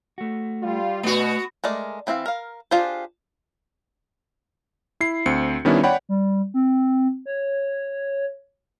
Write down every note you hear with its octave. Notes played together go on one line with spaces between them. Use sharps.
A3 F#4
G3 F4
B2 A3 B3 F#4 D5 G#5
G#3 A3 A#4 D5
E3 C4 E4 E5 F5
A#4 F5
D4 F4 G4 G#4 C5
E4 C7
D2 C4 C#7
D#3 G3 B3 C#4 D4 E4
C#5 D5 F#5 G5 B5
G3
C4
C#5